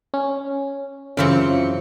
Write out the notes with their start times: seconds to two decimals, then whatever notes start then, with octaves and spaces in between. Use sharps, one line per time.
0.14 C#4
1.17 F#2 C#3 E3 C4 F4 C#7